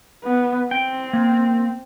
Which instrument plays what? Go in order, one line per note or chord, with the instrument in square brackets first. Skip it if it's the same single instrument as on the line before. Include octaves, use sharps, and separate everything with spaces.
[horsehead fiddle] B3
[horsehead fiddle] C4 [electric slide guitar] G5
[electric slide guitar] A#3